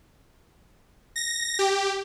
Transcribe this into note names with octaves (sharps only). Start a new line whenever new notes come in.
A#6
G4